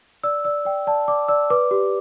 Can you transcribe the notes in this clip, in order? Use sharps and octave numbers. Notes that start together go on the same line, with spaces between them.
D5 E6
D5 E6
D5 G5
D5 A5
D5 D6
D5 E6
B4 D6
G4